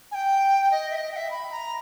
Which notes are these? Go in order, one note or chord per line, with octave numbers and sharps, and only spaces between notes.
G#5
G5
D#5
E5
D#5
G5
E5
B5
A#5